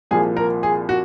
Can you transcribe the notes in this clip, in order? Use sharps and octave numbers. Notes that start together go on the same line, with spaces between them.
C2 A#2 F3 G#4
A#4
G#4
F#4